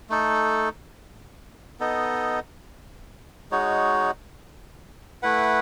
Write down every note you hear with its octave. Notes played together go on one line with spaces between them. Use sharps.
A3 D#4 A4
B3 D#4 A4 D#5
G#3 D#4 F#4 C#5
A3 E4 B4 F#5